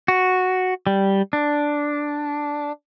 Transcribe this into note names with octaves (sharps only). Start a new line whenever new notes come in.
F#4
G3
D4